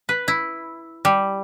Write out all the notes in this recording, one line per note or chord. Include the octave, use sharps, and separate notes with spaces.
B4
E4
G3